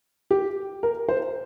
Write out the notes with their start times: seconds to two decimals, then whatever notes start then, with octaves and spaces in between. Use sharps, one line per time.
0.31 G4
0.83 A#4
1.09 C5